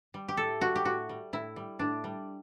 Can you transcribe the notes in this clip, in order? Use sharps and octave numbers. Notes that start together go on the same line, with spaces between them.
G3
G4
A2 A4
G3 F#4
G4
A2 F#4
G3
A2 E4
G3
A2 D4
G3